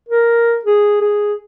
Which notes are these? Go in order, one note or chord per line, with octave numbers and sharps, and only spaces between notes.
A#4
G#4
G#4